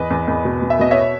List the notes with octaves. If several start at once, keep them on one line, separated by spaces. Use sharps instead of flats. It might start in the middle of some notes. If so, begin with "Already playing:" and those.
Already playing: E2 B4 D#5
E2
E2
B2
B2
E5
B2 D#5
C#5 E5